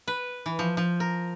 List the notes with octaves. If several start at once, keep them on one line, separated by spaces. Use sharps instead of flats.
B4
E3
F3
F3
A#4